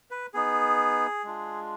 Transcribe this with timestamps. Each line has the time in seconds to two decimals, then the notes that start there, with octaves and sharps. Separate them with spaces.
0.11 B4
0.34 B3 D#4 G#4
1.24 G#3 D4 F4